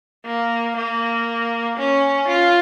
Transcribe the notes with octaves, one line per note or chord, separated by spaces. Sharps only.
A#3
A#3
C#4
F4